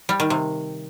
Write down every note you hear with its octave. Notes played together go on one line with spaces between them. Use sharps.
G3
D#3
C3